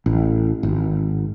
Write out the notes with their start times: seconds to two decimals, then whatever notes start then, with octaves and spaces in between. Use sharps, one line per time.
0.06 A1
0.63 G#1